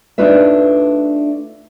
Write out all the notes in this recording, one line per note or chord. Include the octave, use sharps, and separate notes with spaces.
A3 D4 D#4 F4 B4 E5